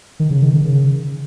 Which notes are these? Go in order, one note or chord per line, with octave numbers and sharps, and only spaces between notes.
D#3
C#3
D#3
D#3
C#3